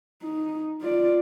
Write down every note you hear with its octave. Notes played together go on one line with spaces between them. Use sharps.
D#4
F4 D5